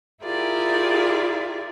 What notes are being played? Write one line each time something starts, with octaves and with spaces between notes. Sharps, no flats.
E4 F4 G4 G#4 A#4 D5